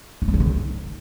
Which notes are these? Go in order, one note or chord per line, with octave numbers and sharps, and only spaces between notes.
C#4
G3
C#4
D#3
D#4